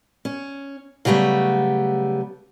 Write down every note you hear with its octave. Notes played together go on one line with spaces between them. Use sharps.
C#4
C#3 F#3 G3 A3 B3